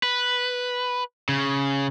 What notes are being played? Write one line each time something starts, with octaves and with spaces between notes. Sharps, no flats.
B4
C#3